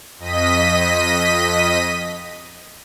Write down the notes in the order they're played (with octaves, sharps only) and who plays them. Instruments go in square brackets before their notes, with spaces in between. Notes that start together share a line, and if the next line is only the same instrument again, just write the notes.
[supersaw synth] F2 D#5 B6 D#7